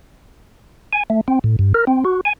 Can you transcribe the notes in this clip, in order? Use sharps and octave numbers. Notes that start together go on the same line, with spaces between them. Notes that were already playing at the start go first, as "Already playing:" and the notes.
G#5
A3
C4
A2
G2
A#4
C4
F#4
G#5